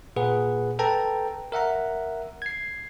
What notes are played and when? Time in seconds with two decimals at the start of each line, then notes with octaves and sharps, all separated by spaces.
0.16 A#2 G#4 B4 F#5
0.79 A4 B4 G5 A5 A#5
1.52 A#4 E5 F#5 A#5
2.42 G#6 C7